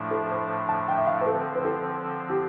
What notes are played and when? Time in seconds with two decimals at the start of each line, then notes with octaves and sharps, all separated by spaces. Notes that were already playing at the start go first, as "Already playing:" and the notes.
Already playing: A2 F3 A3 D4
0.11 A4
0.30 C5
0.69 A5
0.88 G5
0.97 E5
1.07 F5
1.21 B4
1.26 D3 F3 C4 A4
1.55 B4
1.65 A4
2.30 G4